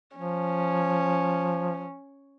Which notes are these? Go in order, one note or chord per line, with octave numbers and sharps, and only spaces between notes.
F3 C#4